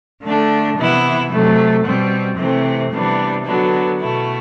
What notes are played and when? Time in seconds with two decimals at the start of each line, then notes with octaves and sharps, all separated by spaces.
0.23 D3 A3 D4
0.77 C3 E3 B3 E4
1.31 C3 F#3 A3
1.84 B2 G3 C4
2.38 C3 E3 A3 C4
2.91 C3 E3 G3 B3 D4
3.45 D3 F#3 B3 D4
3.99 B2 A3 E4